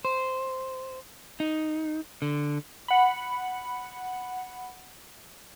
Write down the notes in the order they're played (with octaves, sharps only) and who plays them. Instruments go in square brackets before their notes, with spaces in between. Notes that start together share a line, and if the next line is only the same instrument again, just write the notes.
[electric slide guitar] C5
D#4
D3
[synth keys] F#5 B5